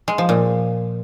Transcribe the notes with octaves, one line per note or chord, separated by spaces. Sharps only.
G#3
F3
A#2